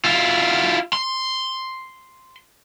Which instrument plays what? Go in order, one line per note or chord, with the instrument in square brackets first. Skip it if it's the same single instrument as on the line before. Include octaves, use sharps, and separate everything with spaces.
[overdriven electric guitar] E4 F4
C6